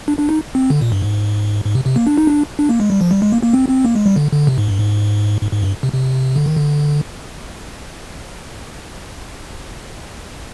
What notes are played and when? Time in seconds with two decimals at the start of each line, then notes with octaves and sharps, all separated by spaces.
0.08 D4
0.19 D4
0.29 D#4
0.55 C4
0.70 D3
0.81 A#2
0.92 G2
1.02 G#2
1.65 G#2
1.75 C3
1.86 C3
1.96 A#3
2.07 D4
2.18 D#4
2.27 D4
2.59 D4
2.69 A#3
2.80 G#3
2.90 G3
3.01 F3
3.11 G3
3.22 G#3
3.32 A#3
3.43 A#3
3.53 C4
3.69 C4
3.85 A#3
3.95 G#3
4.06 G3
4.16 D3
4.32 D3
4.47 C3
4.58 G#2
4.68 G2
4.79 G#2
5.41 G#2
5.52 G#2
5.62 G2
5.83 C3
5.94 C3
6.36 D3
6.46 D#3
6.57 D3